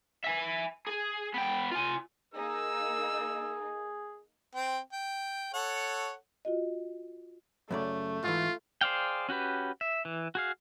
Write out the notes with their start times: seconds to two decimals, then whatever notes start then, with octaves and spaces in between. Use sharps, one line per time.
0.24 E5 G#5
0.87 G#4
1.34 B3 G5
1.72 F4 G#5
2.34 A#3 D#4 G#4 E6
4.55 C4 G5
4.93 G5
5.54 A4 C#5 F#5
6.45 F4 F#4 D#5
7.71 F#2 C#3 A3 D5
8.23 G#2 E3 F4
8.81 G#4 C5 D5 F5 G5
9.29 C#4 F#4 G4 B4
9.81 E5
10.05 E3
10.35 F#4 G#4 F5